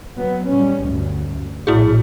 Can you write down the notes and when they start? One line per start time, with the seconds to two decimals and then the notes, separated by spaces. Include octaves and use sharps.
0.16 F#3 B3
0.49 G3 C#4
0.83 D2 G2
1.67 A#1 A2 E4 F#4 G#4